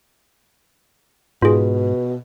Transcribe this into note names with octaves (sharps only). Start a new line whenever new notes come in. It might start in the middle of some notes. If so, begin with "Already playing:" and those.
G#2 B2 F4 G#4